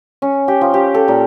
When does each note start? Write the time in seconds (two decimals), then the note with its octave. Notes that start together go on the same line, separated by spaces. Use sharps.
0.22 C#4
0.48 G4
0.61 F3
0.74 G4
0.94 A4
1.08 A#2